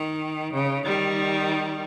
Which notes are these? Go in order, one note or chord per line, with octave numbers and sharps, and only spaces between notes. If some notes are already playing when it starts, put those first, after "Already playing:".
Already playing: D#3
C#3
D#3 G3